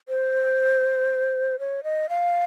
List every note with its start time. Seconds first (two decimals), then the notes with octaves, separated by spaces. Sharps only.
0.09 C5
1.59 C#5
1.84 D#5
2.09 F5